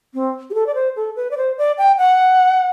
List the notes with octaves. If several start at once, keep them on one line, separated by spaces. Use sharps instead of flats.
C4
G4
A4
D5
C5
A4
B4
D5
C5
D5
G5
F#5